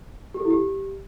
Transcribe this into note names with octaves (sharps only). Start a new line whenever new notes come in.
G4
A4
E4
G4